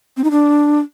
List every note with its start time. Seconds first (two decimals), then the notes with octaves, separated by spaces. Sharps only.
0.17 C4
0.24 D#4
0.31 D4